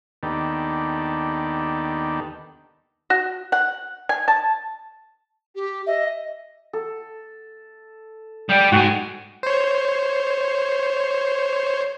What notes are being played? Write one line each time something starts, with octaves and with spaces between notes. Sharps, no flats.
D#2 D#3 B3 D4 G4 A4
F#4
F#5
G#5
A5
G4
D#5 E5
A4
G3 D5 G5
G#2 F#4 G#5
C5 C#5